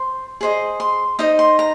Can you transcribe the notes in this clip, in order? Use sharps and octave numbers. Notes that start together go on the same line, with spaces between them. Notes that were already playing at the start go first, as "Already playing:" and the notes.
Already playing: C5
G#4 C5 D#5
C6
D#4 C5 D#5 D#6
C6
A#5